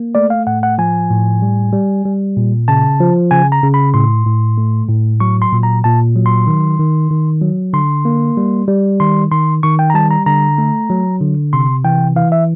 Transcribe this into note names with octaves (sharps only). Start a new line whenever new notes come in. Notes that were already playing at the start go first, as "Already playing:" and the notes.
Already playing: A#3
A3 D5
F5
A2 F#5
F#5
F3 G#5
A2
G3
G3
G3
A#2
C#3 A5
F3
C#3 G#5
A#5
C#3
B5
A2 C6
A2
A3
A2
F#3 C#6
C6
A#2
A#5
A#2 A5
F#3
C6
D#3
D#3
D#3
F#3
D3 C6
A#3
G3
G3
D#3 C6
D#3 C6
D#3 C#6
G5
A#5
G3 A5
A#5
D3 A#5
A3
F#3
D3
C3 C6
E3 G5
E3 F5
E5